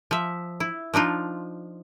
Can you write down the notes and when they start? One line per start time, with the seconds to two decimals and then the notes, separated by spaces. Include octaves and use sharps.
0.11 F3 E5
0.60 E4
0.94 F3 D4 D#4 F4